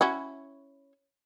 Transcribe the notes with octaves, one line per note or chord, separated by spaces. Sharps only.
C#4 E4 F#4